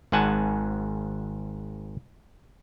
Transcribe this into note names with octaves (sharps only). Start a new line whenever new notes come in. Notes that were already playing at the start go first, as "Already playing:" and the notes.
G#1 G#2 F#5 G#5 A5